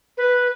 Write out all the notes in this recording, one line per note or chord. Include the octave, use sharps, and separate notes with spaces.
B4